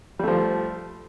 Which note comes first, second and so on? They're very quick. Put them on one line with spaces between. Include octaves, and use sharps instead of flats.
G3 A3 F3